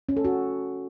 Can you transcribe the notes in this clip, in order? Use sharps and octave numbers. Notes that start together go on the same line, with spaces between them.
C#4
A4
F#4